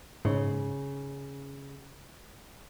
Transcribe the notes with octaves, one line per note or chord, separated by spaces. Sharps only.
G#2 C#3